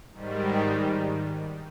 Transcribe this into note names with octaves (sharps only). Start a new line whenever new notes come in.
G#2 D#3 G3